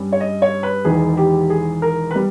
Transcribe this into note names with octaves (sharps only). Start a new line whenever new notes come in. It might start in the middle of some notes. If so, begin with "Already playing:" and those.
Already playing: G2 G3 C#4
C#5
D#5
C#5
B4
E1 E2 D#3 G#4
G4
G#4
A#4
B4
G3